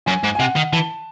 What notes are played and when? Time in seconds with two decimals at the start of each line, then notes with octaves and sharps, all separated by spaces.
0.06 F#2 G#5
0.23 G#2
0.35 G#5
0.39 C3 F#5
0.56 D#3
0.73 E3 A5